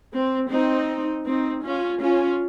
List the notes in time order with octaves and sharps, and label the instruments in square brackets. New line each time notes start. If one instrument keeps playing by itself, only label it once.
[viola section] C4
C4 D#4
C4 D#4
C#4 F4
C#4 F4